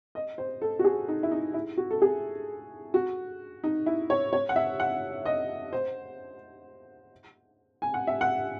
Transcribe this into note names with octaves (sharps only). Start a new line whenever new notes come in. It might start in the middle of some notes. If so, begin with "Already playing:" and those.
D#5
C5
A4
F#4
G#4
D#4
E4
D#4
E4
F#4
A4
G#4
F#4
D#4
E4
C#5
C#5
F#5
E5
F#5
D#5
C5
G#5
F#5
E5
F#5